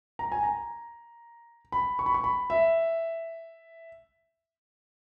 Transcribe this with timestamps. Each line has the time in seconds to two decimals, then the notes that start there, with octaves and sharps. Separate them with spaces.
0.19 A#5
0.32 G#5
0.43 A#5
1.72 B5
1.99 C#6
2.06 B5
2.14 C#6
2.24 B5
2.50 E5